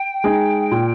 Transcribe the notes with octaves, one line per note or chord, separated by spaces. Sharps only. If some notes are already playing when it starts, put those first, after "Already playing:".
Already playing: G5
G#3 D#4 G#4
A#2